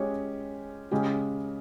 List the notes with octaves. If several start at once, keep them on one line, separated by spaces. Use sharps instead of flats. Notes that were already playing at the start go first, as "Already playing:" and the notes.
Already playing: G#3 C#4 G4 C#5
C#3 G#3 C#4 G4